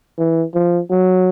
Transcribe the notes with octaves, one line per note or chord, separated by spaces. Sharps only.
E3
F3
F#3